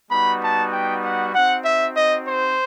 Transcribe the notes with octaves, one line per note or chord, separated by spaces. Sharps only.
G3 B3 D#4 F#4 B5
A5
G5
F#5
C4 D#4 F#4 F#5
E5
D#5
C5